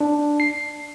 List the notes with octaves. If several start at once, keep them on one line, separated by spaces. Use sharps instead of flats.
D4
C7